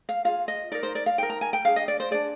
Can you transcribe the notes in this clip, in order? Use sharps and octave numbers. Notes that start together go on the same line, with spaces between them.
F5
F4 G#4 F5
D#5
D#4 A#4 D5
C5
D5
F5
D#4 A#4 G5
A#5
G#5
G5
D4 G#4 F5
D#5
D5
C5
D4 G#4 D5